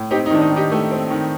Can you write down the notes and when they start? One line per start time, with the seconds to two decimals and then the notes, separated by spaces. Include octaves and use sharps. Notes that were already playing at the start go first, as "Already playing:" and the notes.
Already playing: A2
0.11 C4 D#4 G4
0.26 D#4
0.31 D#3 D4
0.41 D#4
0.51 D#3
0.56 D#4 G4
0.72 A3
0.91 C4
1.10 D#3